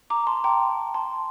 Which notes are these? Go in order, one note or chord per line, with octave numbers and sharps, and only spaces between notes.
A#5 D6
A5 C6
G5 A#5
A5 C6